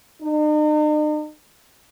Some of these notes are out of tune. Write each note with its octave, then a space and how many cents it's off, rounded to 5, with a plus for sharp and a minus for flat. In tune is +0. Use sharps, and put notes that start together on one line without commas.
D#4 -45